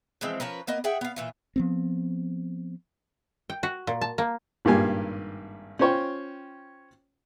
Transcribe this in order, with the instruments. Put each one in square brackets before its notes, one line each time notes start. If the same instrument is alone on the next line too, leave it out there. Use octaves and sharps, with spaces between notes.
[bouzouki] E3 F3 G#3 C4
F3 C#4 A#4 B4
A#3 B3 D#5
G#4 E5 F#5 G5
B3 F5
A#2 E3 F4
[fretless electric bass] F3 B3 C4
[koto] G5
F#4
A#2
A5
A#3
[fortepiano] G#1 G2 A#2 A#3 G4 G#5
C#4 F4 C5 C#5 G5